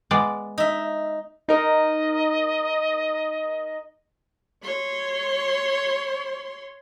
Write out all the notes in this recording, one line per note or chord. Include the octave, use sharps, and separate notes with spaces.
G#3 B3 D5
D#4 E5
D#4 A#4 D#5
C#5 C6